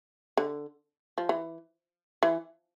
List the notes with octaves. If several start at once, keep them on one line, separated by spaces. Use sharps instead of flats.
D3
F3
E3
E3